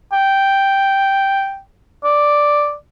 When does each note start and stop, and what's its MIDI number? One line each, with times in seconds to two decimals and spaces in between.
0.13 1.59 79
2.04 2.74 74